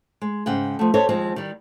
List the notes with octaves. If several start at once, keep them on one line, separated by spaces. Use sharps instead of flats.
G#3
G#2 C#3 F#5 G5
F3 A3
G4 A4 C5 C#5 D#5
D#2 F3 G#3 C4
D#3 G3